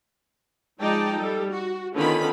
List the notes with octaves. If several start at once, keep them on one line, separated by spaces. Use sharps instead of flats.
F3 G#3 D#4 D5 G5 A5
G3 A4
F#4
D3 D#3 B3 C#4 F4 B5